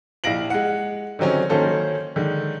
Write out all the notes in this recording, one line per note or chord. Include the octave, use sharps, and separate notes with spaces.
A#1 E4 F5 A#6 D7 F#7
G#3 F#5
D3 D#3 F#3 C4 C#4
D#3 F#3 A#3 C#4 A4 C5
D3 D#3 G#3